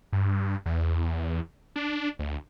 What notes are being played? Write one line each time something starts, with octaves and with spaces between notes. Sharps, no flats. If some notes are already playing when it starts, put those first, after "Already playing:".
G2
E2
D4
D2